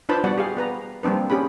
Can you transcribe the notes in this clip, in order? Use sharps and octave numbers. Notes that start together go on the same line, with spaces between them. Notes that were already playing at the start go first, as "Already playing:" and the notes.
D4 F4 B4 C5 A5 B5
G3 B3 F#4 D5 F#5
G4 G#4 F5
B3 B4 A#5
G3 A#3 C4 D4 B4
C#4 G4 G#4 B5